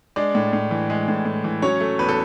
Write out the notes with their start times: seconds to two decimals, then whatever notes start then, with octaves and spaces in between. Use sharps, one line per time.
0.16 G#3 D4 D5
0.35 A2
0.53 A2
0.71 E3
0.90 G#3
1.08 A2
1.25 A2
1.44 E3
1.62 F#3 C#4 C#5
1.80 A3
1.99 E2 B4
2.09 A4